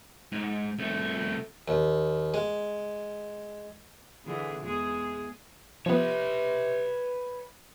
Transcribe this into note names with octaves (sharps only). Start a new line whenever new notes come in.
G#2
C2 A3
D#2
G#3
D3 E3 G#4
E2 G#3 G#4
C3 F3 B3 B4 C#5